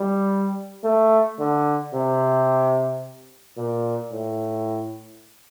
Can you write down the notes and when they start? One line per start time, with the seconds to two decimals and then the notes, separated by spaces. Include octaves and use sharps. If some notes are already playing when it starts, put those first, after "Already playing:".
Already playing: G3
0.83 A3
1.39 D3
1.93 C3
3.57 A#2
4.12 A2